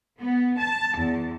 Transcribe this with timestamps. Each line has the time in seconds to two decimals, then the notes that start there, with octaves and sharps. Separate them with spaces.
0.19 B3
0.58 A5
0.97 E2